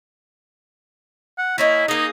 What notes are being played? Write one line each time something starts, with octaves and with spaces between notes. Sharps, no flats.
F#5
A#3 C#4 D#4 E4
A#3 D#4 G#4